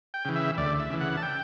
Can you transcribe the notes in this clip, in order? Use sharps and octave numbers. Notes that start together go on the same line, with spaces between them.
G5
C#3 E3
E5
D2 D5
E5
C#3 E3
F#5
A5
G5